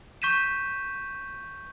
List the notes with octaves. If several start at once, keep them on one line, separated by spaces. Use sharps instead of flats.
C#6 G6 B6 D#7 E7